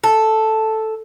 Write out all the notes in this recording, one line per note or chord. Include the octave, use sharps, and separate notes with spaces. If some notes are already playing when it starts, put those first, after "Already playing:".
A4